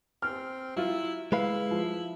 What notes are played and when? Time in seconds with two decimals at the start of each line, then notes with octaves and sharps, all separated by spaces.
0.22 C4 F6
0.76 F#3 E4 F4
1.32 G#3 E4 B4 F5
1.71 F3